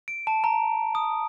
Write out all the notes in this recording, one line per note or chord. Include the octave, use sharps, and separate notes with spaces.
D7
A5
A#5
D#6